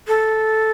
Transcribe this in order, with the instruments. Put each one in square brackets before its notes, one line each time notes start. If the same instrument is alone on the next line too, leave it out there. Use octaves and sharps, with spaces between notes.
[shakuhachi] A4